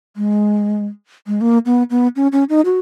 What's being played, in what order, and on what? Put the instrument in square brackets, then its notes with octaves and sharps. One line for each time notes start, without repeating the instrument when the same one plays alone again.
[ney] G#3
G#3
A#3
B3
B3
C#4
C#4
D#4
F#4